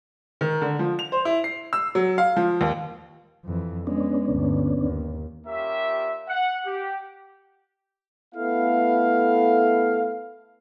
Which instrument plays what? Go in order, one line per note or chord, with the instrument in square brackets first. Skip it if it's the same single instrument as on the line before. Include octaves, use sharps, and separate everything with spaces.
[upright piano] D#3
D3
F3
F7
C5
E4
C7
E6
F#3
F5
F3
D#2
[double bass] F2 E3
[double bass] G#3 [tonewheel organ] B3 C#4 D4
[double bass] G1 D2
D#2
[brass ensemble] G3 C#4 F4 G4 A#4 E5
F#5
G4
A3 B3 E4 A4 F5